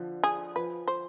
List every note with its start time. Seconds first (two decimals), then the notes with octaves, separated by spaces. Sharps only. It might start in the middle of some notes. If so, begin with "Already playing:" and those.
Already playing: D3 F3
0.24 G#4
0.56 F3 B4
0.88 C5